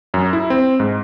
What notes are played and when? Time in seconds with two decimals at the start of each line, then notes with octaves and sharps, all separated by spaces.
0.14 F#2
0.33 E4
0.50 C4
0.80 G#2